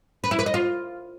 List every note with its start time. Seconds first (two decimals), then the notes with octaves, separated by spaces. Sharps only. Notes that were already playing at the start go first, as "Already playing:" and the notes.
0.24 B4
0.31 E4
0.39 B4
0.46 D#5
0.54 F4